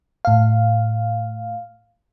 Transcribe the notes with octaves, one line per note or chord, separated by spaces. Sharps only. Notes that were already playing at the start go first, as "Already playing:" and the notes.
A2 F5